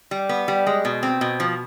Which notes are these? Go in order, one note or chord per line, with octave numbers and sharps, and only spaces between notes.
G3
B3
G3
G#3
B2
C4
B2
F3